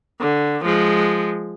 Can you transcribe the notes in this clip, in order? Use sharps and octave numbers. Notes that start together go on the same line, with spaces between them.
D3
F3 G#3